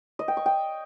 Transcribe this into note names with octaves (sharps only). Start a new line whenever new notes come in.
D#5
G5
C#6
G5